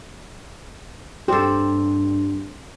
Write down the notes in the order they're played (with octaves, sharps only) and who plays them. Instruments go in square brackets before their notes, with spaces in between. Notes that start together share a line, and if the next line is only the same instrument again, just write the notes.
[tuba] G2 [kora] C4 A4 [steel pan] G4